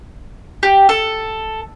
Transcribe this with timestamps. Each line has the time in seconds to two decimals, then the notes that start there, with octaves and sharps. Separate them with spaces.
0.63 G4
0.89 A4